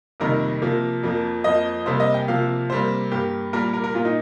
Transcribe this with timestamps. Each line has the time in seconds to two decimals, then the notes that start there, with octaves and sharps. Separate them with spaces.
0.20 F2 C3 D#3 G3 A#3 A#4
0.62 C3 F3 A#3
1.03 F2 F3 A#3
1.44 F2 F3 A#3 D#5
1.86 C3 G3 A#3 C5
2.00 D#5
2.14 G5
2.28 C3 F3 A#3 F5
2.70 C3 G3 A#3 C5
3.11 G2 G3 A#3 G4
3.53 A#2 G3 A#3 A#4
3.73 A#4
3.84 A#4
3.94 A#2 A#3 F4
4.05 D#4